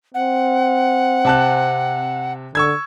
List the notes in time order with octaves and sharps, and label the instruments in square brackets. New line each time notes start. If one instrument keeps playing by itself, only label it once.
[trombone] C4 [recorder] F#5
[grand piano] C3 A5 F#6
[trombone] D3 [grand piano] C#6 E6 G#6